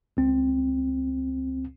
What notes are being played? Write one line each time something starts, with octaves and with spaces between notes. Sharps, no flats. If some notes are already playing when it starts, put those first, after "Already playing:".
C#2 C4